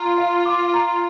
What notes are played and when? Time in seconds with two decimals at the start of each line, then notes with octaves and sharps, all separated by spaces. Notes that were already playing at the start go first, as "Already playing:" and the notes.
Already playing: F4 A#5
0.18 F5
0.46 D6
0.74 A#5